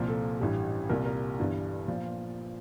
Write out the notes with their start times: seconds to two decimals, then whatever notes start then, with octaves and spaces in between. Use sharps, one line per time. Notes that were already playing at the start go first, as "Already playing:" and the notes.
Already playing: C2 A#2 F3
0.08 A4
0.40 A1 G2 E3 G3
0.89 C2 A#2 G3 A#4
1.05 A#4
1.39 G1 G2 E3 G3
1.88 A#2 F3